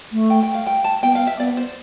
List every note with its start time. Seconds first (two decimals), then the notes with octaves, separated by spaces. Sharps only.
0.12 A3
0.30 G5
0.43 G5
0.54 F5
0.67 G5
0.84 A5
1.03 B3 G5
1.15 F5
1.27 E5
1.39 B3 D5
1.57 C5